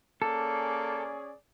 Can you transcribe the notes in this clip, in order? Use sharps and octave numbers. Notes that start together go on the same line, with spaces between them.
A#3 C#4 G#4 A4 D5